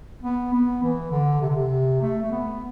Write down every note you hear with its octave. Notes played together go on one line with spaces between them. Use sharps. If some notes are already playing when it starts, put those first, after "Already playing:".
B3
B3
E3
D3
C3
D3
C3
A3
A3
B3